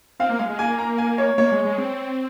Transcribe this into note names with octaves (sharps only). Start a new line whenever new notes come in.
C4 F5
A#3
G#3 F5
G#3
A#3 G#5
A#5
G#5
C#5
A#3 C#5
G#3
G#3
C4